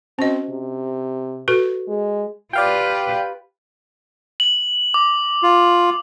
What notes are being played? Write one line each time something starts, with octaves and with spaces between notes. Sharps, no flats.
C4 C#4 F#4 D#5
C3
F#4 A4 B4
G#3
F4 G4 B4 D5 F5 G5
F#7
D6
F4